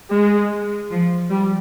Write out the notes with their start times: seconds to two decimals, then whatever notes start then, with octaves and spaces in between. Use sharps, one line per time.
0.15 G#3
0.91 F3
1.30 G3